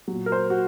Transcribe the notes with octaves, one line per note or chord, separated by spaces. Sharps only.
A#2 F#3
A#4
C5
F#4